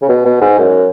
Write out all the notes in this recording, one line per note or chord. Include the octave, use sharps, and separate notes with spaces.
C#3
B2
B2
G#2
F#2